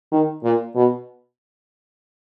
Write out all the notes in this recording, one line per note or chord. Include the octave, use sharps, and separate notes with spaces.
D#3
A#2
B2